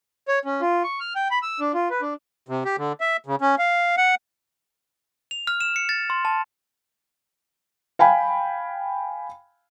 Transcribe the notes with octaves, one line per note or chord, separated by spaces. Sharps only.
C#5
C#4
F4
C#6
F6
G5
B5
E6
D4
F4
B4
D4
C3
G4
D3
E5
C#3
C#4
F5
F#5
F7
F6
E7
C#7
A6
C6
A5
F5 G5 G#5 B5